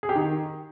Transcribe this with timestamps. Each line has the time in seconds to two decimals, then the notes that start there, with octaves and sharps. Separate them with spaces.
0.03 G#4
0.09 G4
0.15 D#3